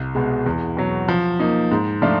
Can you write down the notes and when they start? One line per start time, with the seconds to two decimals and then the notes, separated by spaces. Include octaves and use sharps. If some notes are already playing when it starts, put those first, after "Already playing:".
Already playing: C2
0.15 B2 G#3
0.46 E2
0.77 B2 F#3
1.09 F3
1.40 A#3 D#4
1.71 G#2
2.02 F3 A3 D4 F4